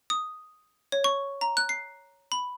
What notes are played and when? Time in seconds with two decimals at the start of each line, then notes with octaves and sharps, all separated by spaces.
0.10 D#6
0.92 C#5
1.04 C#6
1.41 A#5
1.57 F#6
1.69 C7
2.32 B5